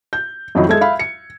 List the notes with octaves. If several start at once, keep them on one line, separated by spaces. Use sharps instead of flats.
G6
F2 D#3 F#3 D#4 E4
G#3 A4 E5 G#6
E5 F5 B5
C#7